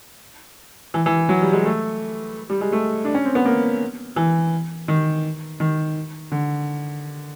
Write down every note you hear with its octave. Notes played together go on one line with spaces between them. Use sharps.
E3
E3
F#3
G3
G#3
A3
G3
G#3
A3
D4
C#4
C4
B3
A#3
E3
D#3
D#3
D3